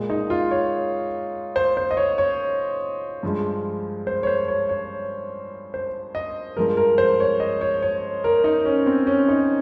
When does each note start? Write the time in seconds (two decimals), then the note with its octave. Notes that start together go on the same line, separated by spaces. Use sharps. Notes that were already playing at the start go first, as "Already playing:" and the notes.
Already playing: A#2 G#3
0.10 D#4
0.30 F4
0.51 C#5
1.56 C5
1.77 C5
1.91 D#5
1.97 C#5
2.18 C#5
3.23 G2 F3 G#3
4.07 C5
4.23 C#5
4.27 C5
4.48 C#5
4.69 C#5
5.74 C5
6.15 D#5
6.57 G2 F3 G#3 A#4
6.77 A#4
6.98 C5
7.20 C#5
7.40 D#5
7.61 C#5
7.82 C#5
8.24 A#4
8.44 D#4
8.65 C#4
8.86 C4
9.07 C#4
9.28 D#4